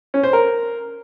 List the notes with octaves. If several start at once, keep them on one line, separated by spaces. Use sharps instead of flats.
C#4
C5
A#4